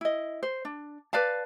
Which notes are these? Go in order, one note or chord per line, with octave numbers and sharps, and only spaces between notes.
E4 D#5
C5
D4
B4 D5 F5 A5